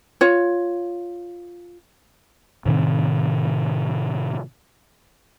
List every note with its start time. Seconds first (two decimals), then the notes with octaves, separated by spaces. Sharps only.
0.21 F4 C#5
2.66 A2 C3 D#3 C4